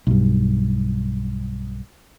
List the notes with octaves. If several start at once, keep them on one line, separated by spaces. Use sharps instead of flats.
B1 G2